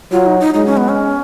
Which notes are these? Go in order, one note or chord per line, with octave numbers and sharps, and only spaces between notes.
F#3 F4
D#4
D#4
G#3 D#4
C#4
B3
C#4